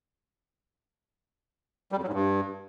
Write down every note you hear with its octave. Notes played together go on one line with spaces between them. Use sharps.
G3
F2
F#3
G#2
G2